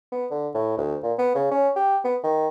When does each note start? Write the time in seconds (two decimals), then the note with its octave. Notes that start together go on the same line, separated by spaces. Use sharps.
0.12 B3
0.31 D3
0.54 A2
0.78 D2
1.03 A#2
1.19 B3
1.35 C#3
1.51 C#4
1.76 G4
2.04 B3
2.23 D#3